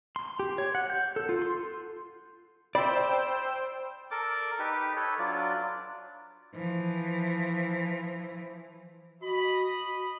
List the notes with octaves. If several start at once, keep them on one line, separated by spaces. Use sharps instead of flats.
C6
G4
C#5
F#5
G6
A4
F4
C6
C5 D5 G5 B5 E6
A4 A#4 D5 D6
D#4 G4 B4
A4 B4 C#5
F#3 D4 F4 D5
E3 F3
F#4 D#5 B5